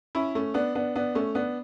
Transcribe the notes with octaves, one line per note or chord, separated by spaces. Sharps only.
C#4 E4
A3 C#4
B3 D4
B3 D4
B3 D4
A3 C#4
B3 D4